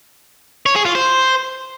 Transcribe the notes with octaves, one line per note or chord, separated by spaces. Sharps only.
C#5
G#4
F4
C5